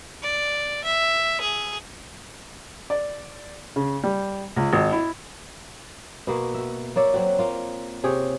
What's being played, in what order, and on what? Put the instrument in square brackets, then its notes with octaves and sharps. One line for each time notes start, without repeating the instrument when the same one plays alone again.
[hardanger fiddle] D5
E5
G#4
[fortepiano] D5
C#3
G3
C#2
G#1
E4
[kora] B2 A#3 F#4
F#4 E5
A#3 C#5 D5 E5
F#3 C4 F#4
A#3 F4
C3 G#4 C#5 G5